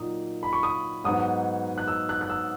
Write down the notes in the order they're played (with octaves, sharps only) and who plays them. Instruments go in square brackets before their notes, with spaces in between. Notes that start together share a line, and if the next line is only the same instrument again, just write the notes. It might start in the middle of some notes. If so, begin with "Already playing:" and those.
Already playing: [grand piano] A#2 F#3 A#3 D#4 D#6
B5
C#6
D#6
G#2 F#3 B3 D#4 D#6
F#6
E6
F#6
F#6
E6